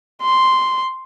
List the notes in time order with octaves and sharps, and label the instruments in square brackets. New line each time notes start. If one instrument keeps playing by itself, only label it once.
[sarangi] C6